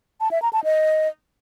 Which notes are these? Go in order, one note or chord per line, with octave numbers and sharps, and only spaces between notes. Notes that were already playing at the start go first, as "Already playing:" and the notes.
A5
E5
A#5
A5
D#5